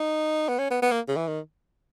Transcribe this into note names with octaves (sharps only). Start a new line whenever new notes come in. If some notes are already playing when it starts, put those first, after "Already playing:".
Already playing: D#4
B3
C#4
B3
B3
A#3
C#3
E3
D#3